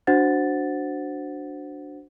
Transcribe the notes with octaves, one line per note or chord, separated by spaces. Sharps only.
D4 F#4 C5 F#5 A6